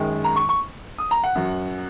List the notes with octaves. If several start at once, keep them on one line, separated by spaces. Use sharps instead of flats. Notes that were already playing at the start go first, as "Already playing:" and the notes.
Already playing: F#2 D#3 G#3
A#5
C#6
C#6
D#6
A#5
F#5
F#2 F#3